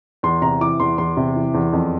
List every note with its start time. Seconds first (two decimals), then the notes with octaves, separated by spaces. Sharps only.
0.23 E2 C6
0.42 C3 A#5
0.61 E3 D6
0.80 E2 C6
0.98 E2 C6
1.17 C3
1.36 E3
1.54 E2
1.73 F2